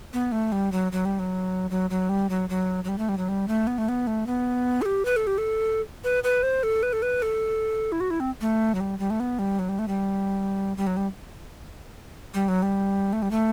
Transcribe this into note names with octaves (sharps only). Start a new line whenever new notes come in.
B3
A3
G3
F#3
F#3
G3
F#3
F#3
F#3
G3
F#3
F#3
F#3
G3
A3
G3
F#3
G3
A3
B3
A3
B3
A3
B3
A4
G4
B4
A4
G4
A4
B4
B4
C5
A4
B4
A4
B4
A4
E4
F#4
E4
C4
A3
F#3
G3
G3
A3
B3
G3
F#3
G3
A3
G3
G3
F#3
G3
G3
F#3
G3
A3
G3
A3